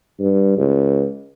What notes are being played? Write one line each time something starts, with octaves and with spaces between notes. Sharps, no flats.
G2
C#2